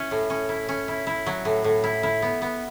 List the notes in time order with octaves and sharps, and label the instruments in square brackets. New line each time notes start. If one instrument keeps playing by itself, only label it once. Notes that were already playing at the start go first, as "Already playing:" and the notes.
Already playing: [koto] C#4 E4
A2
C#4
E4
C#4
E4
E4
F#3
A2
A2
E4
E4
B3
B3